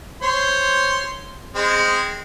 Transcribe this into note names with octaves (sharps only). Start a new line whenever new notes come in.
C5 C#5 C6
G#3 C4